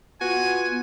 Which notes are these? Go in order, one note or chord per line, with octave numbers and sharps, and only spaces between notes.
B3 F4 F#4 G#5